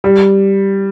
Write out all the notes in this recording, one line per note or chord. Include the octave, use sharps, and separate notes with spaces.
G3